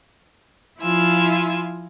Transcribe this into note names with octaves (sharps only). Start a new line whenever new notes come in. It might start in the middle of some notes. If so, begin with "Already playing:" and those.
F3 E4 F4 G#5 E6